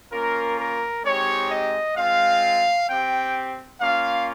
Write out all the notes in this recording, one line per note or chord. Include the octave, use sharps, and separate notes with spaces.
A#3 C#4 F4 A#4
A#4
G#3 C4 D#4 G4 C#5
D#5
G#3 C4 F4 F5
C4 G4 G5
A#3 C#4 F4 F5